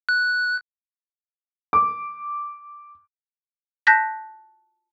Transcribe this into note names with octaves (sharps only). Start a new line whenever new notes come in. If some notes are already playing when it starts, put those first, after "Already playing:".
F#6
D6
A5 F#6 G6 A#6 B6